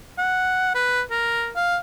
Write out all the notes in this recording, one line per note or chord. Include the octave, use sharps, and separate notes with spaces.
F#5
B4
A#4
F5